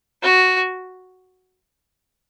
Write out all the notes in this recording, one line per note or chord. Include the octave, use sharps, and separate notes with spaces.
F#4